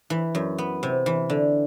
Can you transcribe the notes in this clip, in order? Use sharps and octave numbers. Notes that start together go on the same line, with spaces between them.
E3
F#2
B3
C3
E3
D3